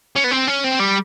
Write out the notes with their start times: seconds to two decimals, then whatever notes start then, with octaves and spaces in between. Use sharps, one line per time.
0.16 C#4
0.24 B3
0.31 C4
0.48 C#4
0.64 C4
0.80 G3